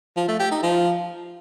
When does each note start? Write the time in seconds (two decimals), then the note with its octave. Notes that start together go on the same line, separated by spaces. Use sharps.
0.17 F3
0.28 A3
0.40 G4
0.51 D#4
0.63 F3